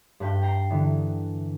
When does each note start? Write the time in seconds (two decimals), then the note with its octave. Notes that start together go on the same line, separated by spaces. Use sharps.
0.20 G2 B4 G5
0.42 G5 A#5 C7
0.70 D3 E3 B3